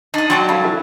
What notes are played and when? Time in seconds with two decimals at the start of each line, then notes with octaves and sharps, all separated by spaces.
0.14 D4 D#4 D#6
0.30 F#3 D5 G5 A5 C6 C#6
0.49 C#4 A4 F5 B5
0.64 E4 A4 E5